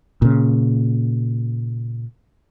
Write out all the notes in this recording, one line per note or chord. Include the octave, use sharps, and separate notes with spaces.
A#2 C#3